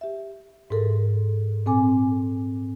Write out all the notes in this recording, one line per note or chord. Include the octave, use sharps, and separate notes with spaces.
G4 E5
G#2 G4 A4 A#4
A#2 C4 A4 G#5 D6